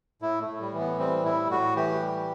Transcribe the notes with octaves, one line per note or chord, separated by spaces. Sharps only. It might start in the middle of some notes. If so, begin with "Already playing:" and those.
A2 E4
A3
A2
G3
E3
B3
G3 C4
A2 E4
A2 F#4
E3 G4
G3